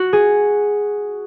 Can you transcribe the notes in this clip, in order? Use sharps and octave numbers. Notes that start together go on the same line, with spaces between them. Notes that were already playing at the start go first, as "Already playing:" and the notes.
Already playing: F#4
G#4